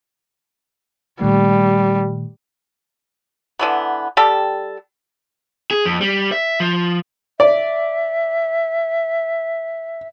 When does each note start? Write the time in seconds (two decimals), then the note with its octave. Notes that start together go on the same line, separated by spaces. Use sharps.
1.21 A#2 D#3 G3 A3
3.59 D3 E3 B3
4.17 G3 G4 A4
5.71 G#4
5.85 F2
6.01 G3
6.32 E5
6.60 F3
7.40 D5 E5